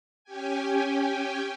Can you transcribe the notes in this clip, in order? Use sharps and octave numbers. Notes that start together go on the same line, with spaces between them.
C#4 G4 G5 G#5